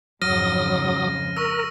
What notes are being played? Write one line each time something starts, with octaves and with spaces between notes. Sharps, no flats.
F2 G#2 C#3 F#3 D#6 F6 A#6 D#7
A#4 C#6 E6